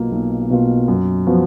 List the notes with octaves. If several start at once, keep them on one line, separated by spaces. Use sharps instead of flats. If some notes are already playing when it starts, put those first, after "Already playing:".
Already playing: B1 B2 A#3 F4
B1
B2 A#3 F4
F#2
F3 B3 F#4